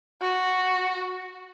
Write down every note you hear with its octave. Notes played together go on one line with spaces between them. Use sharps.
F#4